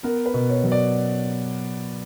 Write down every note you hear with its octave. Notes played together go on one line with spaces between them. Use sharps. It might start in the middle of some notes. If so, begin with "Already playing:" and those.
B3 A#4
B4
B2
C#5
F#3
D5